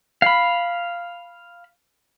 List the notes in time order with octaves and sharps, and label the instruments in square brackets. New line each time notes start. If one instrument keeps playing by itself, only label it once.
[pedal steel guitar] F5 B5